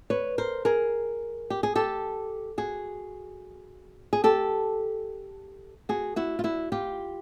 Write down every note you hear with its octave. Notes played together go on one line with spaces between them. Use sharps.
B4 C#5
A#4 C5
G#4 A#4
G4
G#4
G4 A4
F#4 G#4
G#4
G4 A4
F#4 G#4
E4 F#4
F4
E4 F#4
F4 G4